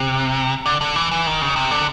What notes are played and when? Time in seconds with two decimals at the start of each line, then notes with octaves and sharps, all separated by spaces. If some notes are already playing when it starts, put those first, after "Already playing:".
Already playing: C3
0.66 D3
0.81 D3
0.96 E3
1.11 E3
1.27 D#3
1.42 C#3
1.56 C3
1.71 D3